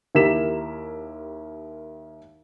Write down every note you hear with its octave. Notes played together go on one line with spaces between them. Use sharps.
D#2 E4 G4 A#4 B6 E7